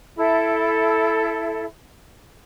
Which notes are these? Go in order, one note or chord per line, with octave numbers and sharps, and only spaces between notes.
E4 A4